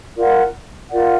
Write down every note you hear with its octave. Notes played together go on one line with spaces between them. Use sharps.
F4 A#4 D5 F#5
F4 A#4 D5 F#5